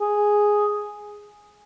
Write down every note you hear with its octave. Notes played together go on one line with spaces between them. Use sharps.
G#4